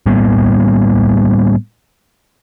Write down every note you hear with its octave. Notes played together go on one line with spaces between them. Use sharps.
A2 G3 A#3 B3